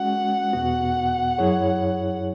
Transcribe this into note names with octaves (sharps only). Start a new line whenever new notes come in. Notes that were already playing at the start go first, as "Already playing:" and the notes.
Already playing: G#3 C#4 F#4 F#5
E2 B2 B3 F#4
F#2 F#3 E4 G#4 C#5